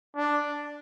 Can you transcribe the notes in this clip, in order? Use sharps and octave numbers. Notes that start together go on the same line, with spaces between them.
D4